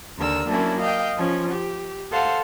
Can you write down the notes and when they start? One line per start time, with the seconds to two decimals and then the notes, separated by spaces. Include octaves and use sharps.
0.18 D#2 D3 A#4 E6
0.49 F#3 A#3 C#4 D4 E4
0.79 D#5 F5 G5
1.16 F3 C#4
1.51 G4
2.11 A4 C5 F5 F#5